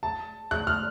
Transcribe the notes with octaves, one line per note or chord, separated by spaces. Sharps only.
A5
F#6
F6